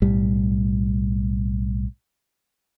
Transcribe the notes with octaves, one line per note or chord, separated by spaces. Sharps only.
B1 A2 G3